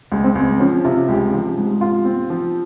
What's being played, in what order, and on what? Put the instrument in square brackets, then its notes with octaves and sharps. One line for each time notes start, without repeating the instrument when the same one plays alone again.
[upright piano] C#2
[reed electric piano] C4
[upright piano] C#2
[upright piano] F3 [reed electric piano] C#4
[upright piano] C3 [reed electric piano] F4
[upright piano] C#2 [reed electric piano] G4
[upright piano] F3
G#2
F4
C4
F3